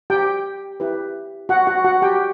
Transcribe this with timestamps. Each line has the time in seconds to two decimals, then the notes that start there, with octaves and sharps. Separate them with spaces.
0.10 G4 G5
0.80 E4 G4 B4
1.49 F#4 F#5
1.67 F#4 F#5
1.84 F#4 F#5
2.02 G4 G5